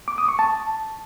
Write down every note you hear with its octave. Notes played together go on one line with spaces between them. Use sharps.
D6
D#6
C#6
A5